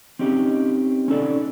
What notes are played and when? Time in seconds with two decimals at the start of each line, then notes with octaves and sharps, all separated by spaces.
0.19 C4 C#4 D#4 G4
1.08 C#4 D#4 A4 D5